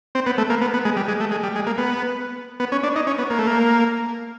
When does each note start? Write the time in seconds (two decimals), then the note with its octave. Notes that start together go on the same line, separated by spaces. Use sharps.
0.15 C4
0.26 B3
0.38 A3
0.50 A#3
0.62 B3
0.74 B3
0.85 G#3
0.97 G3
1.08 G#3
1.20 A3
1.31 G#3
1.43 G3
1.55 G#3
1.67 A#3
1.78 B3
2.60 B3
2.72 C#4
2.83 D4
2.96 D#4
3.07 C#4
3.19 B3
3.30 A#3
3.39 A3
3.47 A#3